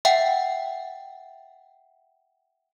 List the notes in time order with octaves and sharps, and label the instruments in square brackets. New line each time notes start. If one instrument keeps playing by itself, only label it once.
[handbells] E5 F#5 G5